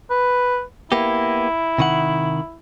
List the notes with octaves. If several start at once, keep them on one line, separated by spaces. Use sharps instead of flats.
B4
A#3 B3 E4 G4
C3 D#3 F#5